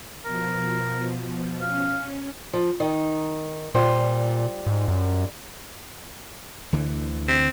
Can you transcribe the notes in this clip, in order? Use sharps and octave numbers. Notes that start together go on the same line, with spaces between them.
B2 F3 A#4
C#4 F5
F3
D#3 D#4
A#2 G3 F4 C5
G#2
F#2
D2 D3 E3
C4